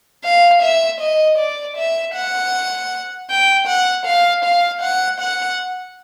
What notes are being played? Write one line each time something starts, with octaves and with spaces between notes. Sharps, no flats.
F5
E5
D#5
D5
E5
F#5
G5
F#5
F5
F5
F#5
F#5